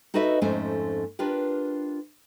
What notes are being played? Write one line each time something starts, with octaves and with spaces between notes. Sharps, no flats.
D#4 F#4 A4 B4 D#5 E5
F2 G#2 A3 C#4 C5 G#5
D4 F4 G4 A#4 B4